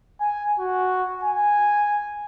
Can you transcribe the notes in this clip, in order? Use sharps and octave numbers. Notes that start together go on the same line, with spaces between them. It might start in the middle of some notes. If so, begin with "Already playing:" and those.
G#5
F#4
G#5